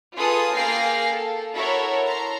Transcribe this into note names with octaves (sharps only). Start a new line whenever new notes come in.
F4 G#4 A4 B4 D#6
A#3 G#4 F5 G5 A#6 C7
A4
E4 F#4 A4 A#4 C#5 E5
A5 A#5 C6